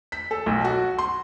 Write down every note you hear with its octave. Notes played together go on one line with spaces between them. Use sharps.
B6
A4
B1
F#4
C6